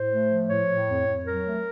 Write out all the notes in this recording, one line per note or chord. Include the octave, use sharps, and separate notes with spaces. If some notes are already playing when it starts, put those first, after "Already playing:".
Already playing: A2 C5
A3
F3
A2 C#5
A2
F2
F2
F#3 A#4
A3